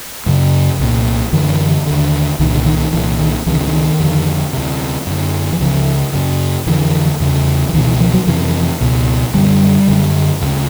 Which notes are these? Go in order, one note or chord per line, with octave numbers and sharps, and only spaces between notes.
F#2 C#3
C2 A#2
F#2 D3 E3
D#2 D3
C2 A#2 D#3
D3
D#3
D#3
C2 A#2 E3
D#3
C#2 C3 E3
D#3
D3
D#3
F2 D3
D2 C3
F#2 D3
E3
C#2 C#3 F3
F#2 C#3
F2 D3 E3
E2 C#3
E3
C#2 B2 D#3
E3
F3
F#3
F2 C3 E3
C#2 B2
F#2 D3 G3
F#2 D3
D2 C#3